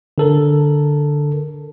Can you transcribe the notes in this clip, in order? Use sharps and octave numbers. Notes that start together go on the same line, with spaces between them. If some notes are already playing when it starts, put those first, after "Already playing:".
D3 A4 A#4